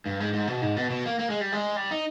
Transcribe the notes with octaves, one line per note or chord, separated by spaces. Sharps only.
G2
G#2
G#2
B2
G#2
B2
B2
A#3
A#3
G#3
G3
G#3
G3
D#4